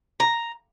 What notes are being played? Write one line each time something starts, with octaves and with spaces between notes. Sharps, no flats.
A#5